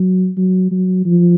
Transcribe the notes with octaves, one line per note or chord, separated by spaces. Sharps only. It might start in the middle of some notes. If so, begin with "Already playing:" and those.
Already playing: F#3
F#3
F#3
F3